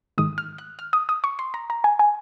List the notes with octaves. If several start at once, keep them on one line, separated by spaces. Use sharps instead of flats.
G#2 D#3 G#3 D#6
F6
F#6
F6
D#6
D#6
C#6
C6
A#5
A#5
G#5
G#5